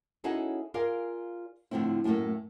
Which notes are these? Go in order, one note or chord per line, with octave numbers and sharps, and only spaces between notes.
C#4 D#4 E4 F#4 G#4 A4
F4 G#4 A#4 D5 F5
A2 D3 F3 C4 E4
F#2 A2 F3 A3 A#3